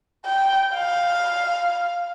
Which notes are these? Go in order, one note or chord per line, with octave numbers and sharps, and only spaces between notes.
G5
F5